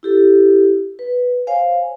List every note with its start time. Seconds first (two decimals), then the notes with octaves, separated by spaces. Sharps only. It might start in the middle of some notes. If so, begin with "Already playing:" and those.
0.03 E4 G4 A4
0.99 B4
1.47 C5 C#5 F5 G#5